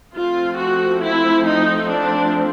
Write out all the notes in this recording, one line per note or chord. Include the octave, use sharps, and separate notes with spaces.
F3 A3 C4 F4
F#4
E4
D#4
D4